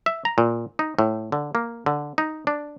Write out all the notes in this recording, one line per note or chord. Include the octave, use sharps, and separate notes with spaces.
E5
A#5
A#2
D#4
A2
D3
A#3
D3
D#4
D4